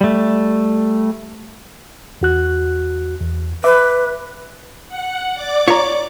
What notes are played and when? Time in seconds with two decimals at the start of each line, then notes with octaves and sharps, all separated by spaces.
0.01 G3 A3
2.21 E2 F#4 F#6
3.21 E2
3.64 B4 E5 D6
4.88 F#5
5.34 D5 D6
5.68 F4 C#5 A#5